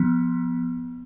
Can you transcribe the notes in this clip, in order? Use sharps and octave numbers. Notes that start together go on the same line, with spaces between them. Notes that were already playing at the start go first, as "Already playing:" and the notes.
Already playing: F3 B3